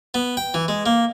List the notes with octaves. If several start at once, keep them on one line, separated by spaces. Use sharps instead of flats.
B3
G5
E3
G#3
A#3